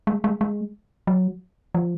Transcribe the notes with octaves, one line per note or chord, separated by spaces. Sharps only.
G#3
G#3
G#3
F#3
F3